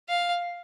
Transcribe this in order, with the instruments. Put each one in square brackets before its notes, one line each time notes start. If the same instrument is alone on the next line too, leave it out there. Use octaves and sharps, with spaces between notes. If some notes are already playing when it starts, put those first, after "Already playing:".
[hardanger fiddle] F5